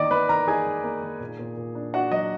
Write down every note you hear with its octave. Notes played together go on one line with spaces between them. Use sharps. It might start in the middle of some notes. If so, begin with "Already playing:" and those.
Already playing: D#3 A#3 D5 D#5 D6
D#3 B4 B5
D#3 A#4 A#5
D#4 G#4 G#5
D#3
A#3
D#3
A#2
A#2
A#2
D4
D4 F#4 F#5
F#3 D#5